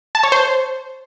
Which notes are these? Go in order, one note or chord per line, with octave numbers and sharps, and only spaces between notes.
A5
C#5
C5